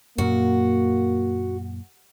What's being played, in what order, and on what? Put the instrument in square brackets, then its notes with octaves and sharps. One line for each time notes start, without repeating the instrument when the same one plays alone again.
[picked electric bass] F#2 A#2 [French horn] A#3 [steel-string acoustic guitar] F#4